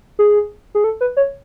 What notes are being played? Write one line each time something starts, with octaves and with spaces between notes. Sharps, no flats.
G#4
G#4
A4
B4
C#5